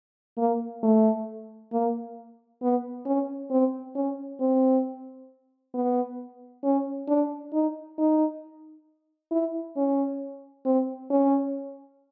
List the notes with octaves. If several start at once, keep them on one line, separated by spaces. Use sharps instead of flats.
A#3
A3
A#3
B3
C#4
C4
C#4
C4
B3
C#4
D4
D#4
D#4
E4
C#4
C4
C#4